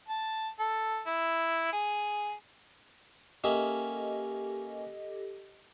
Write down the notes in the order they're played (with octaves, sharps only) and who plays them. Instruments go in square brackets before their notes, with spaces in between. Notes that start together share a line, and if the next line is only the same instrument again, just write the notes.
[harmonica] A5
A4
E4
G#4
[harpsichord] A#3 C#4 E5 [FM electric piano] G4 A4 D#5